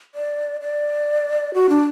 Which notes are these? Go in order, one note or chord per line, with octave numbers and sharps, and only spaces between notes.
D5
D5
F#4
D4